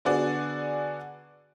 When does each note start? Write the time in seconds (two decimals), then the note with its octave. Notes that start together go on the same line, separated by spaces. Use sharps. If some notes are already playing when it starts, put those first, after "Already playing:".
0.05 D3 B3 F#4 G#4 D5